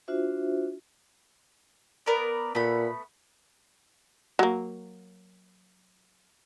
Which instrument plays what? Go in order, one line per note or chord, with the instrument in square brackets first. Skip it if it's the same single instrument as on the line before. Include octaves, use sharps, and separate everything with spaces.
[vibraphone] D4 F4 F#4 C5 E5
[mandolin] B3 A#4 D5
[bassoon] A#2 [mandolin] A3 B3 B5
[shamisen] F#3 A#3